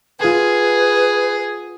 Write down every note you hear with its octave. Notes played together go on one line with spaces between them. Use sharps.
F4 G#4 B4 F#5